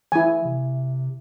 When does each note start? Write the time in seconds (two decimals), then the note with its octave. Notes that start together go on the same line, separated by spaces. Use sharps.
0.12 E3 E4 G#5
0.45 C3